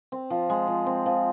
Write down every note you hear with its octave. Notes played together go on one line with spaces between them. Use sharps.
C4
F3
G#3
F3
C4
F3